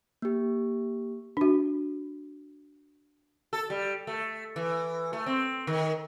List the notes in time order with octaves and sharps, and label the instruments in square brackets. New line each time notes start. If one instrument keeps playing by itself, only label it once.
[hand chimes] A#3 G4
[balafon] D4 F#4
[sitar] A4
G3
A3
E3
A3
C4
D#3